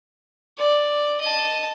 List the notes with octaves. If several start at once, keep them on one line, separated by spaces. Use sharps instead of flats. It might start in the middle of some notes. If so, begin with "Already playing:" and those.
D5
D#5 A5